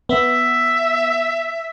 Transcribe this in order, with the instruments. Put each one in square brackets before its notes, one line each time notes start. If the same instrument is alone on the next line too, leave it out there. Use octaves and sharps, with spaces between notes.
[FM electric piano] B3 [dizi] E5